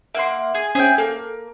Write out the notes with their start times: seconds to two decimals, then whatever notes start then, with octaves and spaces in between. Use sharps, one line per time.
0.15 A#3 E5 F#5 C6
0.55 G#4
0.75 C#4 G#4 C5 E5 G5
0.98 A#3 A4